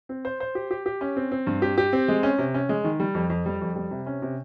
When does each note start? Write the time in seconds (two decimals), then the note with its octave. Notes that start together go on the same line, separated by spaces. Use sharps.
0.09 C4
0.25 C5
0.40 C5
0.55 G4
0.71 G4
0.86 G4
1.01 C#4
1.16 C4
1.31 C4
1.47 G2
1.62 G4
1.78 G4
1.93 C4
2.08 G#3
2.23 C#4
2.38 C3
2.54 C#4
2.69 G#3
2.84 D#3
3.00 G3
3.15 F2
3.30 F2
3.46 G3
3.61 F2
3.76 G3
3.91 C3
4.06 C#4
4.22 C3